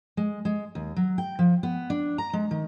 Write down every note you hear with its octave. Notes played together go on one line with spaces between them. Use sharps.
G#3
G#3
D#2
F#3
G5
F3
B3
D4
A#5
G#3
D#3